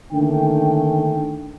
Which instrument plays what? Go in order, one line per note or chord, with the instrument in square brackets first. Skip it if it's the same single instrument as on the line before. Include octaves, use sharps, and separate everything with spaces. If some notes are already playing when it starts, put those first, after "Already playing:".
[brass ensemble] D3 D#3 A3 A#3 C#4 G5